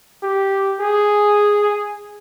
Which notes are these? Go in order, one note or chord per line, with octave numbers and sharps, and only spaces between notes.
G4
G#4